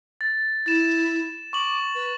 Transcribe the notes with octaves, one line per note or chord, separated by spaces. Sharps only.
A6
E4 A6 E7
C#6 D6 F#7
B4